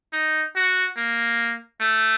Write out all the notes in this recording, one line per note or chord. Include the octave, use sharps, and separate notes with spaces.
D#4
F#4
A#3
A3